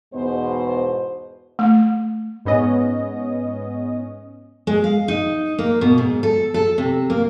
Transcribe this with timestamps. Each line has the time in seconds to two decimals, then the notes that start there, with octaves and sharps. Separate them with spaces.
0.13 E2 G#2 B2 B3 C5
1.59 A3
2.45 G#2 B3 C#4 D#5
4.67 G#3
4.84 F5
5.08 D#4
5.58 A#3
5.81 B2
5.98 G#2
6.23 A4
6.54 A4
6.78 C3
7.10 A#3